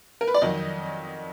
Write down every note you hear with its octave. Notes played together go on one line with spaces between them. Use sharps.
A#4
B4
D5
F2 D#3 F#3 D#5